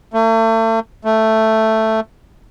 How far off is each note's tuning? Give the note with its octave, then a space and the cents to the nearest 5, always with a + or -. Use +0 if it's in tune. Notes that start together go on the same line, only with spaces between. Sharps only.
A3 +40
A3 +5